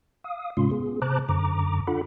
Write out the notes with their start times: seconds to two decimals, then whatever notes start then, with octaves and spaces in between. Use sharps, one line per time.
0.24 F5 D#6
0.57 G#2 C3 G#3 C#4 F4 C6
0.71 B3 G#4
1.02 C3 C5 A5 A#5 D6 F#6
1.29 F#2 D3 A#5 D6
1.87 D4 F4 A4 F#5 B5